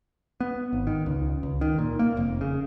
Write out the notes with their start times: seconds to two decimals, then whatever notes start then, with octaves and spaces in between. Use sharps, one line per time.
0.40 B3
0.73 G#1
0.87 D#3
1.06 C#2
1.43 C#2
1.61 D#3
1.79 A#2
1.99 A#3
2.17 F1
2.41 C#3